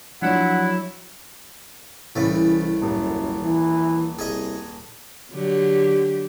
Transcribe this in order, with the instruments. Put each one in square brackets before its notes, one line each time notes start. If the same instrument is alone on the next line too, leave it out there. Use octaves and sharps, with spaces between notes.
[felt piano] F3 D4 [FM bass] F#3 [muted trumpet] E4 [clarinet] F#5
[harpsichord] C2 A3 [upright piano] C#3 [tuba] E3
[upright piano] D#1 [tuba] F#2
[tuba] E3
[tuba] C2 [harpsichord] G#4 D#5
[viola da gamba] D3 F#3 G4